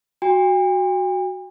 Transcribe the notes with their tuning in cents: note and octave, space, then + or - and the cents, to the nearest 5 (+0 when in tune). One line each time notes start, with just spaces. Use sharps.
F#4 +0 G5 +45